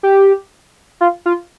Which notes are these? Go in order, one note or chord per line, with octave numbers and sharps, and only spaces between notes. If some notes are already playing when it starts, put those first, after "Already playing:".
G4
F4
F4